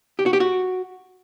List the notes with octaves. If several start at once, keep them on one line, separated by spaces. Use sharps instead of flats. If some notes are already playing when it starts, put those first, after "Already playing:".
G4
F#4
G4
F#4